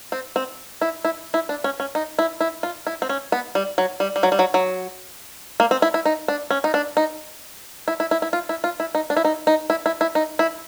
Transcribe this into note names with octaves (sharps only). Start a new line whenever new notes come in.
C4
C4
E4
E4
E4
D4
C#4
C#4
D#4
E4
E4
F4
E4
C4
C#4
B3
G3
F#3
G3
G3
F#3
G3
F#3
F#3
A#3
C4
E4
E4
D#4
D4
C#4
D#4
D4
D#4
E4
E4
E4
E4
F4
E4
F4
E4
D#4
D4
E4
D#4
D#4
E4
E4
E4
D#4
E4